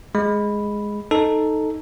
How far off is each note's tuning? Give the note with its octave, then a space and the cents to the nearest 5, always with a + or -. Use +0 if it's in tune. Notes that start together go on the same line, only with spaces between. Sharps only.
G#3 +0 B5 +0
D#4 +0 A4 +0